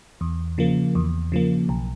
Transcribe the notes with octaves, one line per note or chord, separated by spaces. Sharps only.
E2
C#3 F3 A#3
E2
C#3 F3 A#3
B1